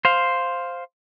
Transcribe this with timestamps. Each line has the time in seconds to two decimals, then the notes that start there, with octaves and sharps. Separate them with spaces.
0.05 C5 F5